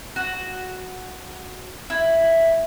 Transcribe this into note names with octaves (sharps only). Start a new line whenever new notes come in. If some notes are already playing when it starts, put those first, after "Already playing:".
F#4
E4